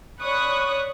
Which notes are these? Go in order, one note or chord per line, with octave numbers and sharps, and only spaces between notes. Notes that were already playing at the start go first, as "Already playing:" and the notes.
C#5 D5 B5 C#6 D#6 F#6